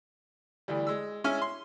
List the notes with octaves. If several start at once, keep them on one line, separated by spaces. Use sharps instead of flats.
D2 E3 G3
G#3 E6
G#3 C#4 E4 E5 G#5 F6
C6